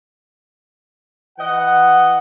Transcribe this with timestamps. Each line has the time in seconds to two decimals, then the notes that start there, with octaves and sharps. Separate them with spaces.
1.39 E3 D#5 F#5